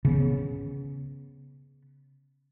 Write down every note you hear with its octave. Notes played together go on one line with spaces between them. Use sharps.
C#3 B3